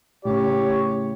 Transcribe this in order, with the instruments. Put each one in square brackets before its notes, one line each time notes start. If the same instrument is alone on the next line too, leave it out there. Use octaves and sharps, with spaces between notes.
[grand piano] A2 C#3 [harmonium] G4 [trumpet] C#5